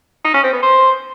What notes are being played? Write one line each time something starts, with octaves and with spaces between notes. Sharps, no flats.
D#4
C#4
C4
B3
C5